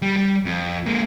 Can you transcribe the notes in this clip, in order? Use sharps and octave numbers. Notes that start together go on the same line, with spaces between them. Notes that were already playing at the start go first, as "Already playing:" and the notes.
G3
G3
F2
G#3 A#3